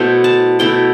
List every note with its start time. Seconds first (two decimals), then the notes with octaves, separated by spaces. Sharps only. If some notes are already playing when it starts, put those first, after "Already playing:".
Already playing: B2 A3 E4 C5
0.24 A5
0.59 B2 A3 E4 G5